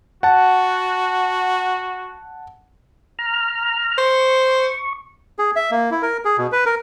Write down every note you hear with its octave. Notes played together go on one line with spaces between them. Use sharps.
F#4 F#5 A5
A#5 F6
C5 C#6
G#4
E5
A#3
E4
A#4
G#4
B2
B4
A#4